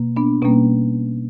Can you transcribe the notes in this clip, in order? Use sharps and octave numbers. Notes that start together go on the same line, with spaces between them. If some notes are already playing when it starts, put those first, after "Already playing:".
Already playing: B2 A#3
B3 D4
B2 G3 A#3 C#4